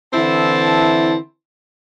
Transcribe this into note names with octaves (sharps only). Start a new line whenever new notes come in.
D3 E3 C4 E4 A5